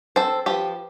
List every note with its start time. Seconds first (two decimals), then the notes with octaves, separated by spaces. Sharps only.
0.16 C4 A4 C5
0.46 F3 G4 B4